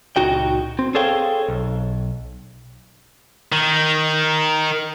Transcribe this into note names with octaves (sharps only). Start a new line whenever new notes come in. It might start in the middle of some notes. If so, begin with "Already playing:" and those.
C#2 A#2 D#4 F#4 G5
C4
G#4 A4 C5 C#5 F5 G5
B1
D#3